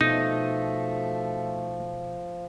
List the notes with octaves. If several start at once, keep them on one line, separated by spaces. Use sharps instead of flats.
B2 F3 A3 D#4